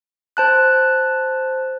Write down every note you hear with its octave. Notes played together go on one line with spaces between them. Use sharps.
C5 A5 F#6